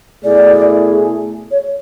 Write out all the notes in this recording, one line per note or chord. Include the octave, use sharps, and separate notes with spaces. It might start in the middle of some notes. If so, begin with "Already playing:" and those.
B2 A3 E4 G#4 D5
C#5